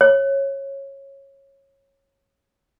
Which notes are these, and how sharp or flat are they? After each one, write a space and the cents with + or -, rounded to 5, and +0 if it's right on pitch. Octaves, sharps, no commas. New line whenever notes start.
C#5 -15